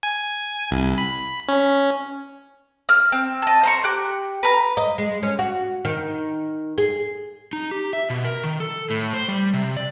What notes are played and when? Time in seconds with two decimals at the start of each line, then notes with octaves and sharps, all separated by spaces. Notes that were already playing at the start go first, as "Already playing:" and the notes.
0.03 G#5
0.71 C2
0.98 B5
1.48 C#4
2.89 F6
3.12 C4
3.42 D#5 A5
3.63 C5 A#5 C#6
3.84 G4 F#6
4.43 B4 A#5
4.77 D#5
4.98 G#3
5.23 C#4
5.39 F#4
5.85 D#3
6.78 G#4
7.53 D#4
7.71 G4
7.93 E5
8.10 B2
8.25 A#4
8.44 D#3
8.60 A4
8.90 A2
9.13 C5
9.28 G3
9.53 C3
9.77 D5